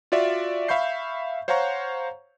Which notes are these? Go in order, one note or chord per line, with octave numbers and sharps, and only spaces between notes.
F4 F#4 D5 E5
E5 F5 B5 C#6 G6 C7
C5 C#5 F5 F#5 A#5 C#6